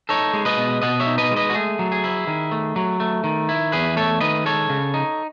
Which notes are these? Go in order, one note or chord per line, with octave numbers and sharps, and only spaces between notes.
D#4 A4 C#5
G#3
B4 D#5
B2
B2 D#5 F#5
C#5 E5
D#4
B4 D#5
G#3
B4 D#5
F#4
A3 G#4
F#3
G#4
E4
D#3
A3
F#3
A3
D#3
E4
E2 G#4 B4
A3 A4 C#5
D#3 B4 D#5
G#3 A4 C#5
C#3
D#4